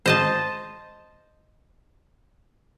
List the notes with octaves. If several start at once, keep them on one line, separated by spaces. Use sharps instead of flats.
C5 D#5 A5